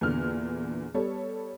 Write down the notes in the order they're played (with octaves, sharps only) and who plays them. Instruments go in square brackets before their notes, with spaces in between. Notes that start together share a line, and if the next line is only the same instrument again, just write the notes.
[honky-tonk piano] E2 A#2 D3 F6
G3 B3 A4 C#5